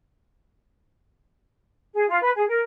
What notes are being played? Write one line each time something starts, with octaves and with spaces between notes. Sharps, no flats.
G#4
F4
B4
G#4
A#4